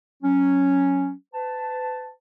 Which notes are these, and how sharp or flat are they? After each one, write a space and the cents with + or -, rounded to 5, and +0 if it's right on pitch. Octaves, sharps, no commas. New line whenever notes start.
F#3 +0 C#4 +0
B4 +35 A5 +0